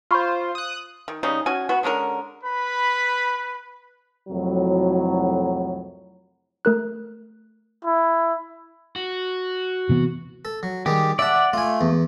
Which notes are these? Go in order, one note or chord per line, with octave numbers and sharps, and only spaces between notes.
F4 C5 B5 C#6 F6
D#6 F#6
D#3
C#3 G3 C#4 D#4
C#4 F#4 G#5
B3 F#4
D3 G#3 C#4 A#4
B4 B5
C2 F2 A2 F#3
A3 A#4 F#6
E4
F#4
C3 E3 B3
A4
F#3
D#3 G3 G#3 G4
D5 E5 F#5 A5
A3 F4 G#5
E2